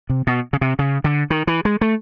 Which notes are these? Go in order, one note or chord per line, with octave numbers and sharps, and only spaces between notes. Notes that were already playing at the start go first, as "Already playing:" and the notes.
C3
B2
C#3
C3
C#3
D3
D#3
E3
G#3
A3